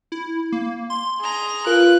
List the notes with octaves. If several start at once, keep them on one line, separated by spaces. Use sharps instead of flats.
E4
A#3
C6
G#4 A#5
F4 A#4 B4 F#6